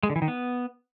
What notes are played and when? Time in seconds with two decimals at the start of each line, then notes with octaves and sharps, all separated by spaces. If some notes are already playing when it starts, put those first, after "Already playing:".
0.03 G#3
0.10 D3
0.16 E3
0.22 D#3
0.28 B3